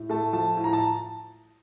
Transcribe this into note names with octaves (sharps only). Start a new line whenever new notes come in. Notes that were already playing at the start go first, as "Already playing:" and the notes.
Already playing: A2
A3 A5
F3 A5
A2
A#5
A5